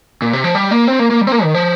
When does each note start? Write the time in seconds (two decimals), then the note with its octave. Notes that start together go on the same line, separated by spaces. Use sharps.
0.22 A#2
0.33 C3
0.44 F3
0.55 G3
0.71 A#3
0.88 C4
0.99 A#3
1.11 A#3
1.21 G3
1.27 C4
1.32 A#3
1.43 D#3
1.54 F3